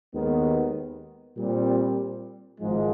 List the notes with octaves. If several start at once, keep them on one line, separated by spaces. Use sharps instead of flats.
D#2 D#3 G#3 B3
A#2 G3 C4
G#1 G#2 F3 G#3